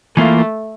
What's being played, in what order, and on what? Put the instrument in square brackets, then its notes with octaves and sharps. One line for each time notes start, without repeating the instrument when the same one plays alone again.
[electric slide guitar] E3 A#3 F4 [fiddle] A3